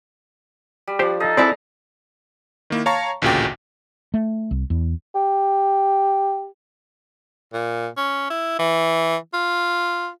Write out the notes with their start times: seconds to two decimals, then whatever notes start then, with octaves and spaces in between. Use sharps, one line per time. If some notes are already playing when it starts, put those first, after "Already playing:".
0.88 G3
0.99 F3 D4 G4 C5
1.20 D#4 A4 D#5 F5
1.37 C4 E4 G#4 B4 D5 F5 A#5
2.70 D#3 A#3 E4
2.86 C#5 F5 A5 A#5 C#6
3.22 A1 D2 A#2 C#3 F#4 G5
4.14 A3
4.51 C2
4.70 E2
5.15 G4
7.53 A#2
7.97 C#4
8.30 E4
8.59 E3
9.34 F4